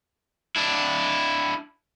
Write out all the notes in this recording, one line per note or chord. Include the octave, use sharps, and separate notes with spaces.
D4 E4